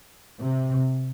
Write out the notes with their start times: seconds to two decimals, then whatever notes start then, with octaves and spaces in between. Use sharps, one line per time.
0.39 C3